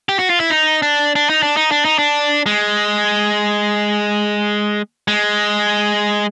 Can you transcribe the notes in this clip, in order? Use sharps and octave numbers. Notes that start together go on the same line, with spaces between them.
G4
F#4
F4
E4
D#4
D4
D4
D#4
D4
D#4
D4
D#4
D4
G#3
G#3